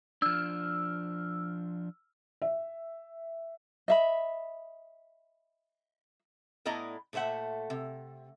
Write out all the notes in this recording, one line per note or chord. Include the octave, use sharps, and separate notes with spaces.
F3 D4 E6 F6
E5
D#5 E5 B5
A2 B3 E4 D5 D#5 A#5
A#2 A3 C5 E5 F#5
C3